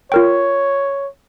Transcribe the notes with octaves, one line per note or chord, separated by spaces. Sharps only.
F4 A#4 C#5 G5